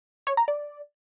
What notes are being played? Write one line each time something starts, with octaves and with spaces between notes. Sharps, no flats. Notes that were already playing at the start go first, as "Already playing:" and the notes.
C#5
A#5
D5